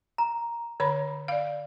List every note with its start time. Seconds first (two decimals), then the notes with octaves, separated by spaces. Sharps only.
0.18 A#5
0.80 D3 C#5 B5
1.28 D5 F5